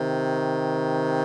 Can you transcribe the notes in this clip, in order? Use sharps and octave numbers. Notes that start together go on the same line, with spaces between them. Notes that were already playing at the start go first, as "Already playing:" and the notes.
Already playing: C3 D#3